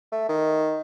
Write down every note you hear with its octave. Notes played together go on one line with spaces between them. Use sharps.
A3
D#3